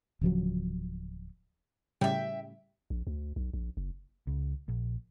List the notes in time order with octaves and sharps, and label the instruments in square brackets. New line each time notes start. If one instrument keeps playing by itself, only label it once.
[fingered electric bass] D1 C#3 F3 F#3
[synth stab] A2 C#3 G3 [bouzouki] E5 G5
[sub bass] A#1
D2
B1
A#1
F#1
[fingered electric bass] C#2
A#1